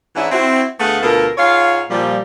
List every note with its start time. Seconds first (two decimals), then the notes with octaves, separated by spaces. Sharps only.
0.16 G#2 E3 C#4 D4 E4
0.31 C4 E4 F#4
0.79 D2 A3 B3 G#4 F5 F#5
1.02 D2 B2 F4 A4 A#4
1.38 G#2 F4 C#5 F5
1.90 A#2 F3 G3